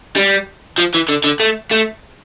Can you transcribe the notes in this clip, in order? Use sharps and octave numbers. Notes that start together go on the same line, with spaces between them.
G3
F3
E3
D3
D3
A3
A3